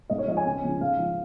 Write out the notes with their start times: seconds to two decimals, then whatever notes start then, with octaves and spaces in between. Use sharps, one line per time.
0.10 G#2 D#5
0.18 C#5
0.28 F3 D#5
0.37 G#5
0.46 C#2
0.64 C#3 F3
0.80 G#2 F5
0.98 F3